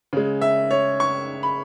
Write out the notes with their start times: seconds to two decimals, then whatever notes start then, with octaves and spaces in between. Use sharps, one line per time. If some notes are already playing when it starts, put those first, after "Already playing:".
0.13 C#3 G#3
0.41 E5
0.71 C#5
1.00 C#6
1.43 B5